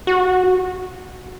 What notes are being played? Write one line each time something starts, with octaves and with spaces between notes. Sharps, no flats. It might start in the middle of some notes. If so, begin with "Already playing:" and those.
F#4